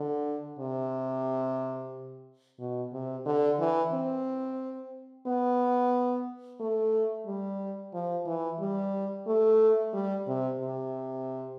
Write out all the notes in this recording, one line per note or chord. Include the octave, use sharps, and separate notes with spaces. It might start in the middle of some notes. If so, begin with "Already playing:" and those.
Already playing: D3
C3
B2
C3
D3
E3
C4
B3
A3
G3
F3
E3
G3
A3
G3
C3
C3